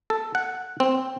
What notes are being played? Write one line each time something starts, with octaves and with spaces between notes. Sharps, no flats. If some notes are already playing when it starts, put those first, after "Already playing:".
A4
F#5
C4